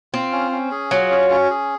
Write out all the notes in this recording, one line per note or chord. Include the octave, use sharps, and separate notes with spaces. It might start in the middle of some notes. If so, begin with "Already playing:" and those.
C4 F4
C#4
C#4
G#4
F#3 F4
C#4
C#4
G#4